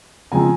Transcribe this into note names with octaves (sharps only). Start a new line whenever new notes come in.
C#3 F3 G#3 C4 G#5 A#5